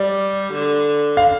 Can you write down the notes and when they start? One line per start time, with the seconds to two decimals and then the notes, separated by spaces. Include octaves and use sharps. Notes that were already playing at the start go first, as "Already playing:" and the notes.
Already playing: G3 D5
0.53 D3
1.17 F5